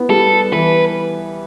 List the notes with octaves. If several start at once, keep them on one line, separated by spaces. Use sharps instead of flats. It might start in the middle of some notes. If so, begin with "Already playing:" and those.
Already playing: B3 E4
G3 A4
E3 B4